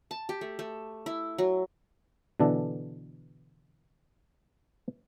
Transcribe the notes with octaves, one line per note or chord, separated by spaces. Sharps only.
A5
G4
A3
A3
E4
F#3
B2 D3 E3 D4 A4